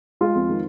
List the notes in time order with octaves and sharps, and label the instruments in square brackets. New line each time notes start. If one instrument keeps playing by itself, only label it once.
[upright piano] G#3 F4
F2
D#3